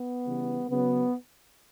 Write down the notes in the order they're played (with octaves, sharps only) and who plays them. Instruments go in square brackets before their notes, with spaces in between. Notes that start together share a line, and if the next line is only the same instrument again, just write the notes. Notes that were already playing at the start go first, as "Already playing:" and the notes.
Already playing: [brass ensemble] B3
C#3 E3 G3
C#3 F#3 B3